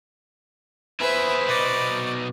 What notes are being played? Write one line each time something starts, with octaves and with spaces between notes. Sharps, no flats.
E4 G#4 B4 C5 E5
B2 D#4 D5